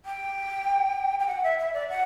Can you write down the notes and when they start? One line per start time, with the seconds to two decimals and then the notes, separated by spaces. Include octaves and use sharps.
0.05 G5
1.19 G5
1.27 F#5
1.43 E5
1.58 E5
1.73 D5
1.89 F#5